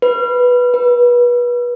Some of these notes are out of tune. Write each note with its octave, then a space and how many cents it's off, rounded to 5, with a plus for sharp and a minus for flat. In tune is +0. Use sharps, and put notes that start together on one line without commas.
B4 -5
B4 -30